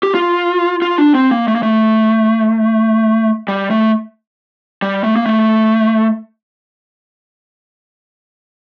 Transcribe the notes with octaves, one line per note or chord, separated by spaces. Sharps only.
G4
F4
F4
D4
C4
A#3
A3
A#3
A3
G3
A3
G3
A3
A#3
A3